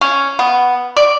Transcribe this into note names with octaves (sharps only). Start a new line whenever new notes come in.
C#4
B3
D5